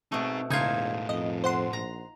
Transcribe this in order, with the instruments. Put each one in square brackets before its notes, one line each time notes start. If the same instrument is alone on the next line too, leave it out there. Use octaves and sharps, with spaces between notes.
[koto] B2 A3 [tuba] C4 [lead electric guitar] D#4 G#4
[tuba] E1 [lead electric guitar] A2 G#4 [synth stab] C#3 G#6 [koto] D#4 F4
[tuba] F2 [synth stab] D#5
[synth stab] C5 F#5 C6
[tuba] A#1 [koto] A#5